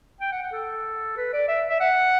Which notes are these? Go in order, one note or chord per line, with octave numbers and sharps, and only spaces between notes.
G5
F#5
F#5
A4
B4
D5
E5
E5
F#5